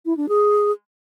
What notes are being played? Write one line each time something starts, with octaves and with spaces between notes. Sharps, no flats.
E4
D4
G#4